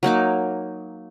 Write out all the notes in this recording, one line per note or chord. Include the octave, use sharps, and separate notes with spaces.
F#3 A#3 D#4 D6